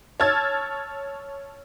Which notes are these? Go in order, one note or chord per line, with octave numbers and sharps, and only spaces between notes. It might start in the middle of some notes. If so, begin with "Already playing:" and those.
C#5 A5 E6 F6 G#6 A6